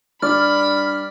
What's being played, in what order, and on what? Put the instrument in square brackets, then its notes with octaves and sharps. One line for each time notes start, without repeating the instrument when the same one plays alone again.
[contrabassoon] G2 [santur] D5 [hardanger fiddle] B5 [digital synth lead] F6